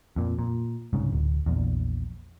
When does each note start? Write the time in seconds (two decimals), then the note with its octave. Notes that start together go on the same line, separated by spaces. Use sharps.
0.16 F2 A#2
0.39 A#2
0.93 C2 G#2 C#3
1.12 D1
1.46 A#1 E2